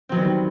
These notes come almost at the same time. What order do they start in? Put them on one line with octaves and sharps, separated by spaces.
C4 F#3 B3 D#3 G3